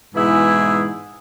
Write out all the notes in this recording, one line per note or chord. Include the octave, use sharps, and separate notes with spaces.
G#2 B2 E3 E4 G#4